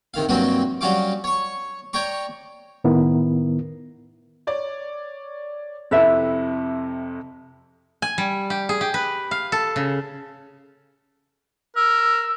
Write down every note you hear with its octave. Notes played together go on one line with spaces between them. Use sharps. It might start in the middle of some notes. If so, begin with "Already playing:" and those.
C3 D#3 F5
G2 C3 F#3 A#3 C4 F#4
F#3 G3 C#4 F#4 F5 D6
C#5 C#6
C#5 D5 G5 A#5 C#6
A2 D#3 B3 E4 A#4
C#5 D5
F2 C3 E4 A4 B4 E5
G#5
G3
G4
G#4
G4
B4
F5
A4
C#3
A#4 E6